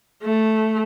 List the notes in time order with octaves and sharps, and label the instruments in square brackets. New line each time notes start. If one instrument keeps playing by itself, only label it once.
[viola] A3